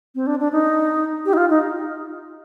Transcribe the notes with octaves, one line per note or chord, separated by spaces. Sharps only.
C4
D4
D4
D#4
G4
D#4
F4
D#4